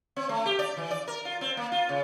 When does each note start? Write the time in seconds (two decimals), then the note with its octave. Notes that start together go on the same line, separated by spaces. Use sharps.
0.16 C4
0.29 A3
0.46 G4
0.59 D5
0.77 E3
0.91 D5
1.08 A#4
1.25 F4
1.41 C4
1.57 A#3
1.72 F4
1.89 C#3